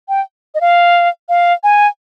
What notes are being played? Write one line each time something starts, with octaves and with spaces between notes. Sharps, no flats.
G5
D#5
F5
F5
G#5